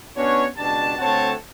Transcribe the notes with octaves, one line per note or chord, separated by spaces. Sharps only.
B3 C#4 D4 F#4 C#5
C#2 B2 D4 G4 A5
D2 A3 C4 C#5 F#5 A5